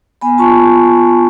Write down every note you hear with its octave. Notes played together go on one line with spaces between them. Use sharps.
B3 G#5 B5
F4 A5 C#6
F4